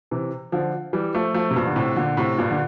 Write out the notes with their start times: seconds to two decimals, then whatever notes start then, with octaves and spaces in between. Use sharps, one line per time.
0.11 C3 E3
0.52 D3 F3
0.93 E3 G3
1.15 F3 A3
1.34 F3 A3
1.51 C3
1.56 G2 A#2
1.67 D3
1.76 A2 C3
1.96 A#2 D3
2.17 A2 C3
2.38 G2 A#2
2.51 D3